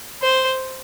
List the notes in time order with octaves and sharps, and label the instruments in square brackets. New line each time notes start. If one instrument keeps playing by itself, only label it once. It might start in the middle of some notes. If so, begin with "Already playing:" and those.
[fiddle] C5